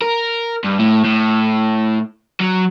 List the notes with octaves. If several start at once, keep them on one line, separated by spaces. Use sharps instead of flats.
A#4
G2
A2
A2
F#3